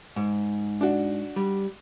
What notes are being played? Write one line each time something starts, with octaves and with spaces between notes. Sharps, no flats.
G#2
D4 F#4
G3